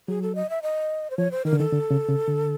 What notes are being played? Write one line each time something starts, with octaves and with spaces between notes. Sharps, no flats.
F#3 G#4
A4
D#5
E5
D#5
C5
F3 C#5
C5
D#3 A#4
D3
D#3 A4
D3
C#3
C#3
D3